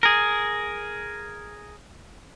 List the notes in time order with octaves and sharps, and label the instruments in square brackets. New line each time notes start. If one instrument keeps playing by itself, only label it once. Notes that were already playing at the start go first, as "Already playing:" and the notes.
[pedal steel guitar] G#4 A#4